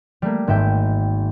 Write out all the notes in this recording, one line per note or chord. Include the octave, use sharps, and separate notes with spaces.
G3 A3 A#3
G#1 G#2 E5 G5